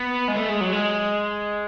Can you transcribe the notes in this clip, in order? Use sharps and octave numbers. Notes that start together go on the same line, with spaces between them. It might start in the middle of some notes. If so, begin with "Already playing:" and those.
Already playing: B3
G#3
A3
G#3
F#3
G#3